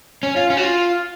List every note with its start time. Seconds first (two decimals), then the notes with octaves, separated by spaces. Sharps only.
0.23 C#4
0.36 F4
0.50 C#4
0.57 F#4
0.63 F4